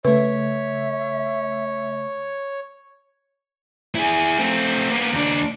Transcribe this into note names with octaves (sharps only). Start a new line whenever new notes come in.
C#3 A3 B4 C#5 E5
E4 G#4
A3 C4
A#3 B3
D#2 D4